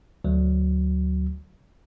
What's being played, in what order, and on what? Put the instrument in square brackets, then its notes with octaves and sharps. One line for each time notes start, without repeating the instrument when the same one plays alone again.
[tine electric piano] D2 F#3